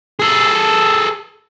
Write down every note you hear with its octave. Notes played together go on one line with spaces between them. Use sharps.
G#4 A4